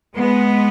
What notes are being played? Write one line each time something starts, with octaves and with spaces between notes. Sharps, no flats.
G#3 B3